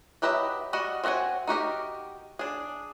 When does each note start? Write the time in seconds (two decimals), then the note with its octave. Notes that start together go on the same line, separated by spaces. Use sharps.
0.22 F#3 G4 B4 D#5 E5
0.73 G3 F#4 D#5 F#5
1.04 C4 F#4 D5 F#5 G#5
1.47 D#4 F#4 G4 A#4
2.39 D4 G#4